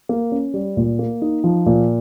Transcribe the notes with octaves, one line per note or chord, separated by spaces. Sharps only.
A#3
C#4
G3
A#2
A#3
D#4
F3
A#2